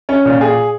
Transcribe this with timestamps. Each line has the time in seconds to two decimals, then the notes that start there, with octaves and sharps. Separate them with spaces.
0.09 C#4
0.25 A#2
0.41 G#4